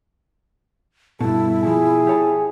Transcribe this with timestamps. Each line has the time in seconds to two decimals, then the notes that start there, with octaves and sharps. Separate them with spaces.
1.21 G2 B2 E4 A4
1.63 B2 F3 G#4
2.07 G4 C#5 A5